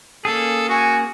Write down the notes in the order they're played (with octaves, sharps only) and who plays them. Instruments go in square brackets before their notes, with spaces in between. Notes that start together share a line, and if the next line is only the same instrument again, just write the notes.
[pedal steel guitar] A#3 C#4 G#4 [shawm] A4
[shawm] F#4 [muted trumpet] G#5